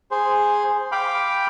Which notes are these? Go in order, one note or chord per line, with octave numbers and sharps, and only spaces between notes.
G#4 C5
F5 G5 B5 D6